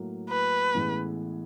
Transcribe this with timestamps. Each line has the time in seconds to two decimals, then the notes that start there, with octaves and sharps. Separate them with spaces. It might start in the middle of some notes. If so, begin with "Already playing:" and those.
Already playing: A2 F#3 A#3
0.29 B4
0.74 A1 A2 E3 G#3 B3